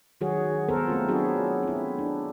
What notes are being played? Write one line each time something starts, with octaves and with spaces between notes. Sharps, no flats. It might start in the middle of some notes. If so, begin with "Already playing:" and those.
D#3 F#3 F#4 G#4 C#5
B3 A4 A#4 C5
A3 C4 F4
F#3 D4 E4 F#4 G#4
C4 E4
D4